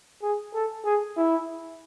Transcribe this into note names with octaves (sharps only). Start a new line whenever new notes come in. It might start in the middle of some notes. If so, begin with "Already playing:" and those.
G#4
A4
G#4
E4